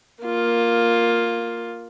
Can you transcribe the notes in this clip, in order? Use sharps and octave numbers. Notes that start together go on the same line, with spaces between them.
A#3 F4